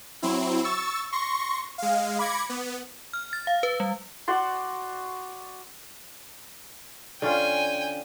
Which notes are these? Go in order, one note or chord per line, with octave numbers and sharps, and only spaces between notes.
F#3 C4 E4
C#6 E6 A6
C6 C#6 A#6
G#3 F5
B5 D6 G#6 A#6 C#7
B3
F6
A6
F5
B4
G3
F#4 D5 C6
D3 C#4 F4 G5 G#5